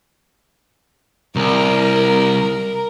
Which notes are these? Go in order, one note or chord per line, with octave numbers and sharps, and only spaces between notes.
C2 A#4